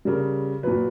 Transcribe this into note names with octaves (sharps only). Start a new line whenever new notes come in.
C#3 G3 A#4
A#2 F#3 B4